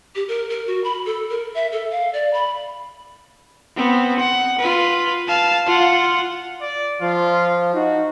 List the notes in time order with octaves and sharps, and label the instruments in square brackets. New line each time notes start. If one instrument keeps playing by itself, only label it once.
[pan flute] G4
A#4
A#4
F#4
B5
A4
A#4
E5
A4
F5
D5
B5
[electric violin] B3 C4
F#5
F4 B4
F5 A5
F4 F#5
[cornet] D5
[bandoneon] F3 [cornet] F4
[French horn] D#4 [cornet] F#4